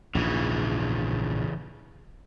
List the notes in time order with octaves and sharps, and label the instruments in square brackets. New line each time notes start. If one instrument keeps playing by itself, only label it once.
[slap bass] A#1 D#2 G#2 [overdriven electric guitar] C#3 E3